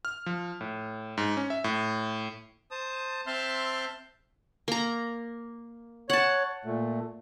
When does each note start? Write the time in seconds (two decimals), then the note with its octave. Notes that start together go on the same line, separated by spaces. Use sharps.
0.05 F6
0.26 F3
0.61 A2
1.17 G#2
1.37 C#4
1.50 E5
1.64 A2
2.71 C5 A5 D#6
3.27 C4 E5 A5 C6 F6 G6
4.68 A#3 A#5
6.10 C#5 F#5 A5
6.65 A#2 A3